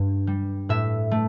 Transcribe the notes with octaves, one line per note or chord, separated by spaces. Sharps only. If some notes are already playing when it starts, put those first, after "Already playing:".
Already playing: G2
G3
A2 E5
A3